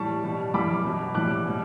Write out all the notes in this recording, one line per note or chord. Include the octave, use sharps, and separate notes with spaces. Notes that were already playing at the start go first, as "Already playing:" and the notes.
Already playing: A2 E3 G3 A5 C#6
B2 G3
F#2 E3 G3 B5 D6
B2 F#3
A2 E3 G3 D6 F#6
B2 G3